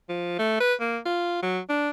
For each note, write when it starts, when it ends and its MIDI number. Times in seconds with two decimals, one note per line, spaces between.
0.09 0.38 53
0.39 0.59 57
0.60 0.74 71
0.80 0.98 58
1.05 1.40 65
1.42 1.59 54
1.69 1.91 62